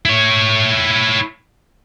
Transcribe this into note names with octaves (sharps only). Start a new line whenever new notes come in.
E4 C#5